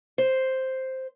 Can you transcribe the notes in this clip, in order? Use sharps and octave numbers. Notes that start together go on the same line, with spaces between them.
C5